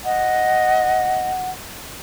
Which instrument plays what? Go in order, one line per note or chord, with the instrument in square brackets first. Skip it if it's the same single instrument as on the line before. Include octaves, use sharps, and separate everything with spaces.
[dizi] D#5 [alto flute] F#5